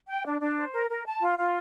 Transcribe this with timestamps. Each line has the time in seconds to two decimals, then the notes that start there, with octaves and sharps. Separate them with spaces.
0.08 G5
0.25 D4
0.40 D4
0.57 C5
0.73 A#4
0.90 A#4
1.06 A5
1.21 F4
1.39 F4